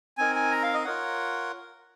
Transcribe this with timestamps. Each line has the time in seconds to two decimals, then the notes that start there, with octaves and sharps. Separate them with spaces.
0.18 C4 D#4 A#4 G#5
0.35 G#5
0.51 A#5
0.63 F5
0.74 D#5
0.85 F4 A#4 C#5 F#5